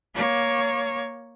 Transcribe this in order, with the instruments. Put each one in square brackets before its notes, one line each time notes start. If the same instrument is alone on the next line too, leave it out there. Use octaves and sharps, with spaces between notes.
[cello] A#3 C#5